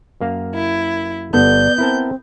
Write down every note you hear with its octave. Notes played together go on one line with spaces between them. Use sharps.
F#2 A#3 F5
E4
G1 B3 A4 D5 A5 G6
C4 E4 A#4 A5